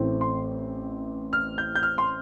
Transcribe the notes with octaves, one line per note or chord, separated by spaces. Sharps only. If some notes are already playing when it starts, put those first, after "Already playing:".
Already playing: A1 A2 E3 A3 C4
C6
F6
G6
G6
F6
C6